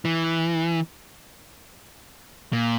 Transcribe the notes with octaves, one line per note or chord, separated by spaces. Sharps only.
E3
A#2